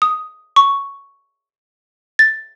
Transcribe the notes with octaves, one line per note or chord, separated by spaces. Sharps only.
D#6
C#6
A6